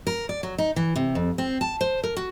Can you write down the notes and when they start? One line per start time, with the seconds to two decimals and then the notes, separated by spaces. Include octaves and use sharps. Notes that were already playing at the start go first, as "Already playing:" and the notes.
0.07 A#4
0.29 D5
0.43 F#3
0.58 D#4
0.76 E3
0.96 C3
1.15 F2
1.38 C4
1.61 A5
1.81 C5
2.03 A#4
2.16 F#4